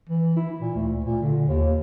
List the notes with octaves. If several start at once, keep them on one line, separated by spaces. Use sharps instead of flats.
E3
E4
A#2
D2
A#2
D3
D#2